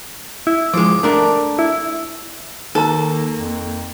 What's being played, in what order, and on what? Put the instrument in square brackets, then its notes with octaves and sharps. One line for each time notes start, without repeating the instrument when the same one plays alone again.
[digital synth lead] E4
[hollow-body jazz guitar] F3 G#3 [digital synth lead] D6
[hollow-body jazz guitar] A3 D4 A#4
[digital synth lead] E4
[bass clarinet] D#3 [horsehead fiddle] A#3 [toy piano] D#4 A#5 [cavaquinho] A4
[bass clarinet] F2